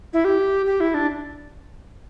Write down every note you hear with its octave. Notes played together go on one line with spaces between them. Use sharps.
E4
G4
G4
E4
D4